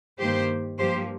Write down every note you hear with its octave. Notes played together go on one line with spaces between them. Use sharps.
G2 D#3 A#3 G4 C5
G2 F3 A#3 G4 C5